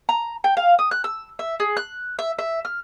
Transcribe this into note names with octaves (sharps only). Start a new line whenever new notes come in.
A#5
G5
F5
D#6
F#6
E6
E5
G#4
F#6
E5
E5
F6